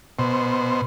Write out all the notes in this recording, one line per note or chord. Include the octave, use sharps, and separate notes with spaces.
B2 C5